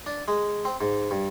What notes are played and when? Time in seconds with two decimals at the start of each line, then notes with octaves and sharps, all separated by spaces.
0.06 D4
0.28 G#3
0.65 C4
0.81 G#2
1.11 G2